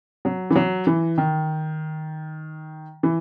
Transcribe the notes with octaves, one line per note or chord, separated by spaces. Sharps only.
F#3
E3
F#3
E3
D#3
E3